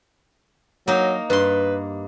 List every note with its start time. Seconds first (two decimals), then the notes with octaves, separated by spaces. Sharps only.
0.88 F#3 A#3 D#4
1.30 G2 B4 C6